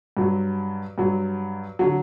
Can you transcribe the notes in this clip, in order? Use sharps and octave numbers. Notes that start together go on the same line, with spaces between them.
G2 F#3
G2 F#3
D3 F#3